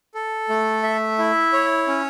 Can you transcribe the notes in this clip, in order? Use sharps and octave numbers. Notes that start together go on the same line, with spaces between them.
A4
A3
E5
E4
C#5
C#4